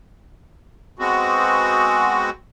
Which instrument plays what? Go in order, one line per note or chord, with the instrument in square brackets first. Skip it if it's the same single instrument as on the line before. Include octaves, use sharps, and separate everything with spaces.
[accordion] G#3 B3 C4 F#4